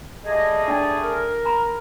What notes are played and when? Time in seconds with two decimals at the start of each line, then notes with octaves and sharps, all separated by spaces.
0.25 G3 A3 G#4 D#5
0.68 D4 D5 G5
1.02 A#4
1.45 A#5 B5